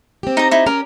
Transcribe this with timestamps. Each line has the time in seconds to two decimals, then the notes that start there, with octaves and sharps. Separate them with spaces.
0.23 C4 G4
0.37 D#4 A#5
0.51 D#4 E4
0.66 C#4 A#4